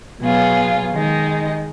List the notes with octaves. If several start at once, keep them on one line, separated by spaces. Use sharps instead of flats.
B2 F#3 B3 F4 G#4
D#3 G#3 D#4